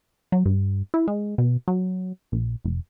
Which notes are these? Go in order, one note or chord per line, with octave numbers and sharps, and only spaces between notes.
F#3
G2
E4
G#3
B2
F#3
A#1
F1